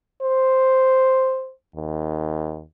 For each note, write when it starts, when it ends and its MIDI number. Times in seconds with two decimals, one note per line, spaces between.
0.22 1.52 72
1.76 2.64 39